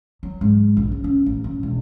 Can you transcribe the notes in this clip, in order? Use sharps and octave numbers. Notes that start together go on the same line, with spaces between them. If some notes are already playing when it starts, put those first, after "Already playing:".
F#3
G#2
A#1
C#3
C#4
A1
F#2
E1